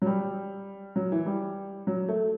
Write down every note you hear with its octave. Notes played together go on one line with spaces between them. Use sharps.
F#3
G3
F#3
E3
G3
F#3
A3